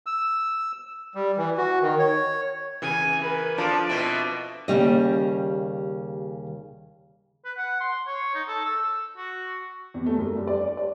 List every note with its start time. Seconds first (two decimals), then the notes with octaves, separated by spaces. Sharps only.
0.06 E6
1.15 G3
1.37 E3
1.58 F#4
1.81 D#3
1.99 C#5
2.82 C#3 E3 G#5
3.21 A#4 B4
3.58 F3 D4 F4 A4 D5
3.89 B2 C4 E4
4.68 D#2 C#3 F#3 G3 D#5
7.45 B4
7.58 F#5
7.81 C6
8.07 C#5
8.35 D#4
8.48 A4
8.65 E6
9.17 F#4
9.94 E2
10.06 A3
10.18 F#2
10.36 G3
10.47 D5
10.61 C#5
10.77 D5